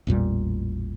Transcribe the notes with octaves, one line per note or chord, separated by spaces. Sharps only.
A1 E2 A#2 G3